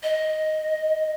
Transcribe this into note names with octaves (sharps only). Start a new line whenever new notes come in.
D#5